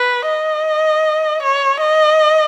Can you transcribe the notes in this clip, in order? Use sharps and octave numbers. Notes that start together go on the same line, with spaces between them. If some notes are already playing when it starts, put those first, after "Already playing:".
Already playing: B4
D#5
C#5
D#5